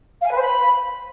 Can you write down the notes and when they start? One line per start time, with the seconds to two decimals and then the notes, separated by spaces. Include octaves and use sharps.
0.21 F5
0.26 G#5
0.31 B4
0.36 C5
0.42 B5